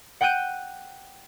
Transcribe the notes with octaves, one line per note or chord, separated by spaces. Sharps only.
F#5 G5 F#6 G6 D#7